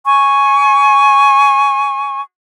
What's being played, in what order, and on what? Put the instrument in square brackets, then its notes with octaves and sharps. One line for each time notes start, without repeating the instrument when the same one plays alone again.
[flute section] G#5 C#6